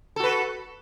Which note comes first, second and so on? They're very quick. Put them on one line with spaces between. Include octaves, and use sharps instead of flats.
A4 F#4 B4